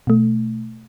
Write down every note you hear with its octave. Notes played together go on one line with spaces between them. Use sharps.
B2 A3